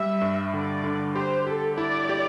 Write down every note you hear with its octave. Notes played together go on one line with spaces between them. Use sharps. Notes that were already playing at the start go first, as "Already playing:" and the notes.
Already playing: G3 E5
G2
D3 D5
D3
G4 C5
G4 A4
E4 D5
G4